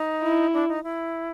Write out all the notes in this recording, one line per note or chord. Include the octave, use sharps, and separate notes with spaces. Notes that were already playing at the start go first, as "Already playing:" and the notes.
Already playing: D#4
E4
D4
D#4
E4